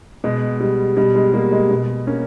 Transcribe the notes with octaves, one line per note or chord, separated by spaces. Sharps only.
B2 G#3
G3
B2 G3
G#3
G3 A#3
G#3
B2
A#3 C#4